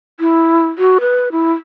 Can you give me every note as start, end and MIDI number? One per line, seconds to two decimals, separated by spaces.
0.20 0.67 64
0.78 0.98 66
1.00 1.29 71
1.32 1.53 64